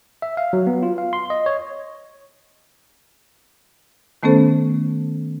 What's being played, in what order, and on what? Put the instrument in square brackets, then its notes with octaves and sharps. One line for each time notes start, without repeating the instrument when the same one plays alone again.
[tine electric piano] E5
F5
F#3
B3
F4
F5
C6
D#5
C#5
[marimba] D#3 A3 B3 C#4 A4 C5